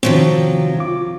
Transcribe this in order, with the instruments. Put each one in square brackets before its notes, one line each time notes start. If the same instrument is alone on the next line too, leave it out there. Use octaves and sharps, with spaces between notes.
[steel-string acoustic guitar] C3 F3 F#3 [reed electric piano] D#3 C4
[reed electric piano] F4 D6